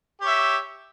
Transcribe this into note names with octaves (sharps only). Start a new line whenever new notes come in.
G4 C#5 E5